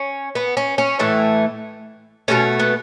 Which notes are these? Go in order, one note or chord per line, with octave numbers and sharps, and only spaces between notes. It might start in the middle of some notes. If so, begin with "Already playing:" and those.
Already playing: C#4
B3
C#4
C#4
A2 E3 A3
B2 F#3 A3 C#4
B3